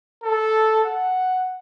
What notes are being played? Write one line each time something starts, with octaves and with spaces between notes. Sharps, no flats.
A4
F#5